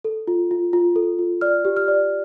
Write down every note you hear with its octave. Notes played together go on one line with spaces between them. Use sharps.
A4
F4
F4
F4
A4
F4
D5 F6
G4
F6
D5